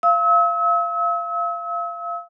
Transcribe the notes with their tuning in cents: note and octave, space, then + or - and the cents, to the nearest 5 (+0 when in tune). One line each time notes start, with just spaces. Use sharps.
F5 -25 E6 -40